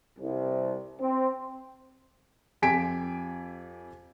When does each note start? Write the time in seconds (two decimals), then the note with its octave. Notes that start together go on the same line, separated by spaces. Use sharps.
0.19 C2
0.99 C4
2.62 F2 G4 G#5 B6 D7